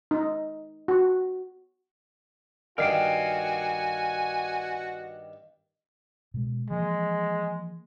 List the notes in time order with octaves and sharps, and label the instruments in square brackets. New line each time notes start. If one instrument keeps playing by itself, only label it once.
[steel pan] D#4
F#4
[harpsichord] G2 D#3 [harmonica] F#4 [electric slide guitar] A#4 F5 G5 [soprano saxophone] G#5
[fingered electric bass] B2 G#3
[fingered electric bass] E3 F3 A#3 [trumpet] G#3